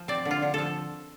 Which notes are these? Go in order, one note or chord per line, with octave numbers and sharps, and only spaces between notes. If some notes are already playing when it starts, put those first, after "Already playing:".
Already playing: F3
C4 D5
D3
F4
D3
F3 A4